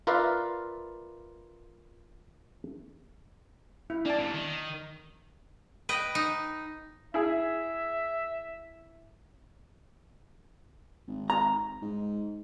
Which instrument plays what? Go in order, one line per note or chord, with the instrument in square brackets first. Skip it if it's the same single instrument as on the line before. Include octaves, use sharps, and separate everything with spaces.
[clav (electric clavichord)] F4 A#4 B4 D5 E5 F5
[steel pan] E4
[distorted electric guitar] A#3 [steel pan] D4 A5
[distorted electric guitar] E2 C3
D#3
[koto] B4 D#5 G5
D#4
[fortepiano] E4 G#4 [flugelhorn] E5
[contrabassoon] G#1
[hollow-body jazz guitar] A#5
[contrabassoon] G#2